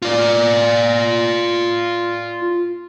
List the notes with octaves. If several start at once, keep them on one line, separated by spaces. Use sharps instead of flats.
F4 D5